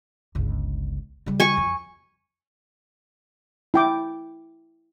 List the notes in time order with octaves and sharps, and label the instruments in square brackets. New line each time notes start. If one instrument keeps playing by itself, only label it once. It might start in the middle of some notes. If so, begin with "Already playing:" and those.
[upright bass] G1 C#2
C#3 G3
[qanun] G#5 C#6
[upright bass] F2
[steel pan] E4 G5 D6